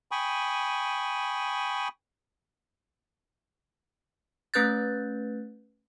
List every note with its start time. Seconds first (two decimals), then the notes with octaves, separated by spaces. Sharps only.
0.11 G5 G#5 B5 C#6 D#6
4.54 A3 C#4 B4 F#6 G6 A6